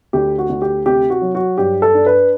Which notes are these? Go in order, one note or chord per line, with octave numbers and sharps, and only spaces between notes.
D2 G4
F#4
D2
G4
C3 G4
F#4
F#3
F#4
G2 G4
A4
D4
B4